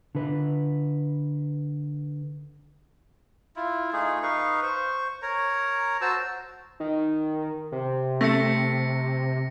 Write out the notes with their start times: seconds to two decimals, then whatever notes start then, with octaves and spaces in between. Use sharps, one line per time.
0.15 D3 B4
3.56 E4 F4
3.93 A3 D#4 F4 G#4
4.23 D#4 B4 F5 C#6
4.63 C5 C#6
5.22 A#4 C#5 A#5
6.01 F#4 C5 A5 E6
6.80 D#3
7.72 C3
8.21 A3 A#6 C#7